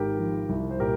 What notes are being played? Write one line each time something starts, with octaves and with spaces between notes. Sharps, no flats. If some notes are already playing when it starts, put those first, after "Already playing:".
Already playing: G#1 G4 A#4
F3
C2
C5
A#2 G4 A#4